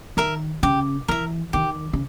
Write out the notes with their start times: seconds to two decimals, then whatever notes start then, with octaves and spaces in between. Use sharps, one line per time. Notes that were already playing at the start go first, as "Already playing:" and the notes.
0.17 D#3 A#4 E5
0.63 C#3 G4
1.08 E3 A#4 E5
1.53 D#3 G4
1.93 C#3